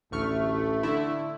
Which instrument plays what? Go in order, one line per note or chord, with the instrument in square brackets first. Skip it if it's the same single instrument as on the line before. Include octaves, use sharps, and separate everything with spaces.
[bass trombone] A1 [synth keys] D2 C#6 F6 [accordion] A3
[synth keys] D3 E4